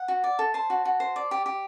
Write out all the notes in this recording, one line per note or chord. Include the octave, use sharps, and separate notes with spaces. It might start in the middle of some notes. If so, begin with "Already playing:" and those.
Already playing: F#5
F#4
D5
A4
C5 A5
F#4
F#4
C5
D5
G4
G4